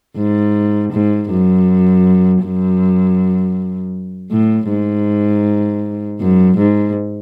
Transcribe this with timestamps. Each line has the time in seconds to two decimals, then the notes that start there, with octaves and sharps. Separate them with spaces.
0.17 G#2
0.92 G#2
1.30 F#2
2.44 F#2
4.31 A2
4.70 G#2
6.20 F#2
6.58 G#2